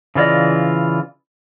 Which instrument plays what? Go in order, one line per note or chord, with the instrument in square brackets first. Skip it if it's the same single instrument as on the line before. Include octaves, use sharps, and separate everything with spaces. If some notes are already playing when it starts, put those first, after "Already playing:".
[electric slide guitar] C#3 E3 F4 D5 D#5